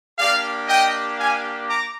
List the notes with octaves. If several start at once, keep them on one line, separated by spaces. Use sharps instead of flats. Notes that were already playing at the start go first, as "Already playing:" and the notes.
A#3 D4 G4 D5 F5
D#5 G5
F5 G#5
A#5 D6